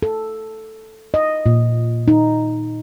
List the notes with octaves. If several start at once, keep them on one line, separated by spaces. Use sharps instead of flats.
A4
D#5
A#2
D#4